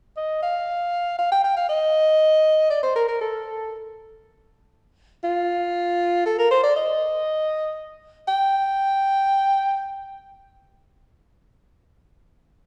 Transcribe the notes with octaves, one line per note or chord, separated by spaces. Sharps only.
D#5
F5
F5
G5
G5
F5
D#5
D5
C5
A#4
A#4
A4
F4
A4
A#4
C5
D5
D#5
G5